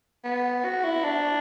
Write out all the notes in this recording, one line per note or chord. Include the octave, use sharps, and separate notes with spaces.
B3
F#4
E4
D4